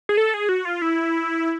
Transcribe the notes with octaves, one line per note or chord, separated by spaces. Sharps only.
G#4
A4
G#4
F#4
F4
E4